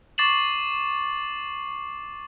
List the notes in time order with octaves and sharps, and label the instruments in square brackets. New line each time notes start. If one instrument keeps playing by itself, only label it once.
[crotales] C#6 D6 A6 C7 E7 F#7